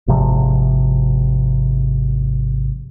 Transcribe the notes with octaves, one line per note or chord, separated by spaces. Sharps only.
G#1 C3 F3